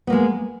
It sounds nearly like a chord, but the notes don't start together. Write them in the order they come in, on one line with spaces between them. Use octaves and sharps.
B3 A#3 G#3